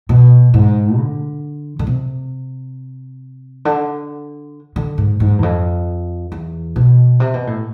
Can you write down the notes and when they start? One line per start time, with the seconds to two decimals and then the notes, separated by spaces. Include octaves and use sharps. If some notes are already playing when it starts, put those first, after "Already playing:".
0.09 B2
0.54 G#2
0.98 D3
1.79 D3
1.87 C3
3.65 D3
4.76 D3
4.98 G#2
5.20 G#2
5.38 E2
5.43 F2
6.32 E2
6.76 B2
7.20 C3
7.34 B2
7.47 A2